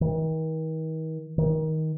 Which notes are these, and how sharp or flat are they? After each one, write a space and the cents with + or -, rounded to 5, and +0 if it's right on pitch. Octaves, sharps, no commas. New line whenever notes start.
D#3 +40
D#3 +20